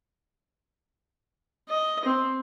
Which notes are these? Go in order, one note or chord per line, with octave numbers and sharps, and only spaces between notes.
D#5
C4